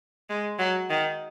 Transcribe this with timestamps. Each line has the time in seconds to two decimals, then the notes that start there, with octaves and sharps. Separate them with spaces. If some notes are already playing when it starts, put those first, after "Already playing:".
0.30 G#3
0.59 F#3
0.90 D#3